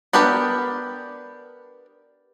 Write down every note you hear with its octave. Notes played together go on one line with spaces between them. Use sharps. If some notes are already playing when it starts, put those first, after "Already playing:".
B3 D4 G4 A#4 B4